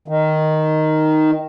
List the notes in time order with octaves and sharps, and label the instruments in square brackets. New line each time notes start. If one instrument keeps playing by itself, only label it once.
[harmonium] D#3